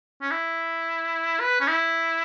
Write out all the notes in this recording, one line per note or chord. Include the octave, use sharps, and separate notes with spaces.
C#4
E4
B4
C#4
E4